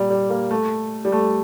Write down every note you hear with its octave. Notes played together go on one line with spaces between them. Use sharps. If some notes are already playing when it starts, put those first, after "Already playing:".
Already playing: A#2 G3
G3
A#3
A3
G3
A3